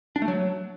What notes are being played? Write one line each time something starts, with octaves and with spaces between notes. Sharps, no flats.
D4
A3
F#3